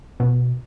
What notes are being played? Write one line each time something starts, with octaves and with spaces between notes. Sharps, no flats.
B2